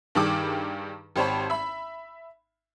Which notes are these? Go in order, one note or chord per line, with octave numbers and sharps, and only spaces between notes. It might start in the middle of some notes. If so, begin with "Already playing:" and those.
G2 D#3 G3 G4 G#4 D6
G#1 G4 C5 C#5 A5 B5
E5 B5